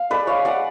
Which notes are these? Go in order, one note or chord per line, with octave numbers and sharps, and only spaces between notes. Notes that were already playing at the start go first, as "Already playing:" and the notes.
Already playing: F5
G#3 B4 D5
C#5 F5
G#3 D5 F#5